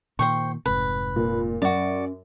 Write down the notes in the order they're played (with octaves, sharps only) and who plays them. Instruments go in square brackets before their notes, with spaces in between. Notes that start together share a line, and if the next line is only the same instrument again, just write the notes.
[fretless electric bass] A#2 D#3 [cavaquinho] C5 G5 C#6
[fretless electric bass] F1 G#2 C3 [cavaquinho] B4
[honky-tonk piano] A#2
[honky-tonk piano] F#2 [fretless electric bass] C#4 [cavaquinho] F#4 D5